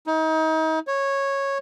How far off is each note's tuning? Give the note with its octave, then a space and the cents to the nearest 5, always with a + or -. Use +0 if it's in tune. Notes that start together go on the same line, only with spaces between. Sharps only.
D#4 +35
C#5 -10